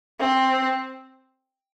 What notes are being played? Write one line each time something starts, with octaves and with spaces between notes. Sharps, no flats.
C4